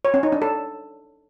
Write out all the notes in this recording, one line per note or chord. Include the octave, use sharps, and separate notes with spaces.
C#5
C#4
D#4
D4
A4